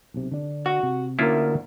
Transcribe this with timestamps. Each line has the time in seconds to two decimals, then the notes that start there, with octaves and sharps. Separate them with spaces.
0.14 B1 C3
0.31 D3 D4
0.66 F#4
0.83 C3
1.19 D2 A#3 C#4 E4 F4 A#4